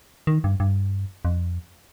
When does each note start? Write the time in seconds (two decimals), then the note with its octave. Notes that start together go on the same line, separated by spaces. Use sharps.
0.27 D#3
0.44 G2
0.60 G2
1.25 F2